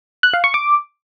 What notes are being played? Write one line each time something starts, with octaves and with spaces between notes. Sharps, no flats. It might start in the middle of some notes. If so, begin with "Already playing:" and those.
F#6
F5
C#6
D6